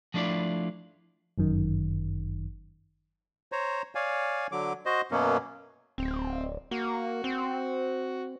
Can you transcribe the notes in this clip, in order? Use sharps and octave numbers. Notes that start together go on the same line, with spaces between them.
F3 A3 D4 E4 F4 D5
G1 F#2 D#3
C5 C#5 A#5
C#5 D5 F5 G#5
D3 F#3 D6
F#4 C5 D#5
F#2 B2 F#3 A#3 B3 C#4
D1 C4
A#3 F#4
C4